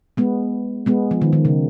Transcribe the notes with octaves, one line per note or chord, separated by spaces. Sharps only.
G#3 B3
G#3 B3
F3
D#3
D#3
C#3